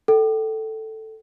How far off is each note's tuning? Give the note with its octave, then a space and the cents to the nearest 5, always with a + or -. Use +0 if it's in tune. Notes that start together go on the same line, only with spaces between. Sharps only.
A4 +0 G5 -35